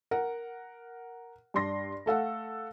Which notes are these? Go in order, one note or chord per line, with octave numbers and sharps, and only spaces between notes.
A#4 F#5
G2 D4 C6 A#6
A3 A4 F5 F#5